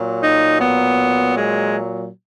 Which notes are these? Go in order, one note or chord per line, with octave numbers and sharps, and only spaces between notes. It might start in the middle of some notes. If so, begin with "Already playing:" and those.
Already playing: A#2 F#3
D#4
B3
G#3